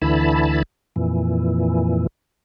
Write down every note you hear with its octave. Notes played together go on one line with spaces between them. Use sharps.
D2 D3 E3 E4 A5 B5
F2 A#2 E3